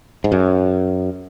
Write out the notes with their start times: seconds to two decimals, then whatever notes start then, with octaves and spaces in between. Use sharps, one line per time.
0.24 G#2
0.32 F#2